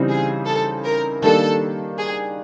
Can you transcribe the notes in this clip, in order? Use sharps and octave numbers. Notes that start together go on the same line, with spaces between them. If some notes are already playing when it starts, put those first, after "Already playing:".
Already playing: C#3 E3 G3 C4 D#4
G#4
A4
A#4
D#3 G3 A#3 D4 A4
G#4